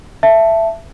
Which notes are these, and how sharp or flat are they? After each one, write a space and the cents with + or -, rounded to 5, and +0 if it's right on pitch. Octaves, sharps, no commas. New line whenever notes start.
E5 +15 A5 +0